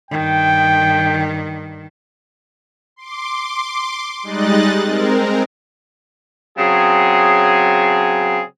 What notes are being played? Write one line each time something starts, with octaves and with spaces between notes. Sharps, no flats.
G2 D#3 G5
C6 D6
G3 G#3 D#4 D#5 F#6 A6
G#3 C4 A#4
C#3 F#3 C4 G#4